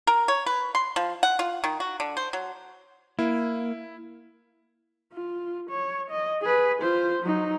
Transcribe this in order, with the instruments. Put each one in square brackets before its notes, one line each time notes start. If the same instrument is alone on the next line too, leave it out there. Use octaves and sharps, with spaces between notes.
[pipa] A#4
C#5
B4
C6
F3
F#5
F4
D#3
F#4
D3
C5
F#3
[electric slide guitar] A#3 [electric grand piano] E4
[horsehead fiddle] F4
C#5
D#5
G#4 B4
F4 C5
F#3 D#4